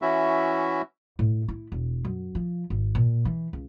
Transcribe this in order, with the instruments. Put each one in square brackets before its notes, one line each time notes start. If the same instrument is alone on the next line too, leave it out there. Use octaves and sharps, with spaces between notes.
[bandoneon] E3 C#4 E4 F#4 E5
[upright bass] A2
E4
E1
F#2
F3
G#1
A#2
E3
C#2